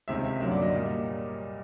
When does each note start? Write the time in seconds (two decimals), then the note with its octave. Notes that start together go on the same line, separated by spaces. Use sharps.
0.08 C#2 C3 D#3 E5
0.24 E5
0.40 F#2 D3 F#3 A#3 E5
0.51 D5
0.62 D#5
0.73 A#2 G3 A#3